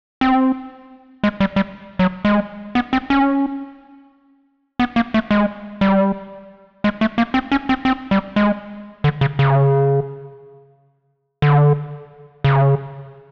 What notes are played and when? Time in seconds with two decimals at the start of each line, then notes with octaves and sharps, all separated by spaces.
0.21 C4
1.24 G#3
1.40 G3
1.56 G3
1.99 F#3
2.25 G#3
2.75 B3
2.93 C4
3.10 C#4
4.79 B3
4.96 A#3
5.14 A3
5.31 G#3
5.81 G3
6.84 G#3
7.01 A3
7.18 A#3
7.34 C4
7.52 C#4
7.69 C4
7.85 C4
8.11 G3
8.36 G#3
9.04 D3
9.21 C#3
9.39 C#3
11.42 D3
12.44 C#3